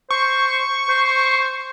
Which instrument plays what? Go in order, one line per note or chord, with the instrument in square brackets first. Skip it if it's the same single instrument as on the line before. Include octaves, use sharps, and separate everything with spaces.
[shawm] C5 [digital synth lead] C#6
[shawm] C5